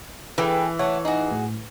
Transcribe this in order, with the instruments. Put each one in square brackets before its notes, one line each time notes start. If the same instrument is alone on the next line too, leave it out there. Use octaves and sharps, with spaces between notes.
[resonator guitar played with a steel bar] E3 [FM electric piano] G#4 B4 [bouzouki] A4 G5 G#5
[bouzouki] A3 F#5 [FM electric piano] C#5
[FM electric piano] D#4 [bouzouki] F#4 G#4
[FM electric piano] A2